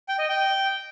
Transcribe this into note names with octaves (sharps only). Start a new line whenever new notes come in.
G5
D#5
G5